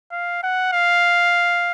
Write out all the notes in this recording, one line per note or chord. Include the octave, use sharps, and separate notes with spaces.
F5
F#5
F5